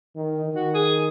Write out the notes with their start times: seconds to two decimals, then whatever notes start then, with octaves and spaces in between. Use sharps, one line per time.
0.16 D#3
0.36 D#4
0.45 D#3
0.55 F#4
0.74 G#4